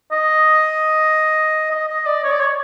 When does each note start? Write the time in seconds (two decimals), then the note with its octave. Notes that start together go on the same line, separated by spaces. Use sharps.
0.12 D#5
1.71 D#5
1.88 D#5
2.06 D5
2.23 C#5
2.32 D5
2.40 C#5